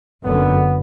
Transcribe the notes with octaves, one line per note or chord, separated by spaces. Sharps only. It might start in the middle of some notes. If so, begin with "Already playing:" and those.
F#1 F#2 D3 B3